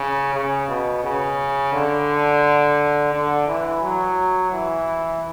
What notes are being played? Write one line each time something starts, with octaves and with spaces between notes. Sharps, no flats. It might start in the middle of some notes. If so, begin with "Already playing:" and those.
Already playing: C#3
C#3
B2
C#3
D3
D3
E3
F#3
E3